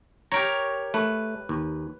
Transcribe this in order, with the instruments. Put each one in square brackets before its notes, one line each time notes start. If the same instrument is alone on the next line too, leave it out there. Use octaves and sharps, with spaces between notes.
[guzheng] G4 A#4 C#5 [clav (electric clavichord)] A#5
[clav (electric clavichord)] A3 [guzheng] B4
[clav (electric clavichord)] D#2